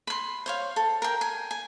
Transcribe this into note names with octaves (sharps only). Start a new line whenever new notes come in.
B5 C6
C5 C#5 F5
A4
A#4 G5
G#5
G#5